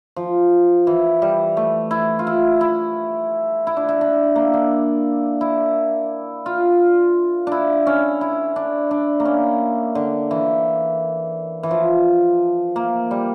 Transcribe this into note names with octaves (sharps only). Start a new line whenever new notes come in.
F3
E3
G3
A3
E4
F4
E4
E4
E4
D4
E4
D4
A#3
D4
E4
F4
D4 E4
C#4
E4
D4
D4
A#3
C#4
D3
E3
E3
F3
A#3
G3